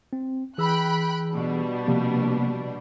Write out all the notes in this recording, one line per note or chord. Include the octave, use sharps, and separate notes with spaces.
C4
E3 G#4 G5 B5 E6 F#6
B2 G3 D4
C3 F3 A#3